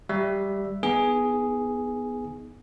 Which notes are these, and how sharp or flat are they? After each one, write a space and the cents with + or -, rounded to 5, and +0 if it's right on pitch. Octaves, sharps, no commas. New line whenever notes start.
G3 +0 E5 +5
B3 +0 D#4 +10 G#4 +0